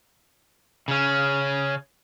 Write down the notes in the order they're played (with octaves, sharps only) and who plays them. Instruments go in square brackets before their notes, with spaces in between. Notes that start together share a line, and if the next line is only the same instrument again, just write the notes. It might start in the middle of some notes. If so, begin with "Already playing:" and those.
[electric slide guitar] C#3 C#4